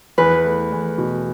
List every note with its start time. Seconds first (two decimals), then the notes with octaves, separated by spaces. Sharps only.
0.18 E2 B4
0.45 A3
0.72 E2
0.98 B2